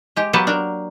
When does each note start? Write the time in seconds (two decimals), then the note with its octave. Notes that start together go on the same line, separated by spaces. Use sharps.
0.16 G#3 G4
0.33 F#3 A#3 B3 G4 B4 A5
0.47 D4 A#4